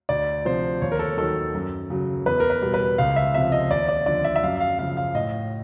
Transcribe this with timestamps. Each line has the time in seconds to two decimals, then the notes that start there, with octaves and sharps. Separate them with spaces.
0.09 D2 D5
0.45 C3 F3 C5
0.82 D#2 C#5
0.92 A#4
0.99 A4
1.17 D#3 F#3 A4
1.54 F#2
1.90 C#3 F#3
2.26 E2 B4
2.40 A#4
2.50 B4
2.62 B2 G3
2.74 B4
2.98 C#2 F5
3.16 E5
3.35 C3 F3 E5
3.52 D#5
3.70 D#2 D5
3.89 D5
4.06 D3 F3 D5
4.24 E5
4.36 E5
4.43 F#2 F5
4.60 F5
4.79 C#3 F3 F5
4.97 F5
5.15 A2 D#5